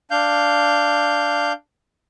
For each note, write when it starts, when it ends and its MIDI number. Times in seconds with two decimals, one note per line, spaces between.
0.11 1.53 62
0.11 1.53 77
0.11 1.53 91